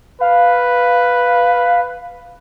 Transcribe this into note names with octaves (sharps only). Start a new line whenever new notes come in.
B4 F5